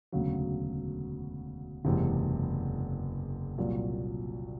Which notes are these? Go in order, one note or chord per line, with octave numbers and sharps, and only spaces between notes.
E1 D2 C#3 F#3
F#1 E2 C3 E3 G#3
C2 A#2 F#3